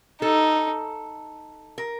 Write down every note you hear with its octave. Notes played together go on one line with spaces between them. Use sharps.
D#4 A4
A#4